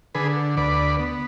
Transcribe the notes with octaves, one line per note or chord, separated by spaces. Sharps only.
D3 G#4 B4
D2 B4 D5
B3